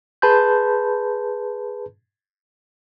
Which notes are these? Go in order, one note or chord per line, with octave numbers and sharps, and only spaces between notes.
G#4 B4 A5 B5 C6 G6